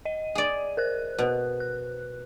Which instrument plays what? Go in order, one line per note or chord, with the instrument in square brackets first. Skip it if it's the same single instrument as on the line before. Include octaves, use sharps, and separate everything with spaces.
[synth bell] D#5 D#7
[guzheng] G#4 D5
[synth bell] A#4 C5 F#6
[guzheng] B2
[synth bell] F#6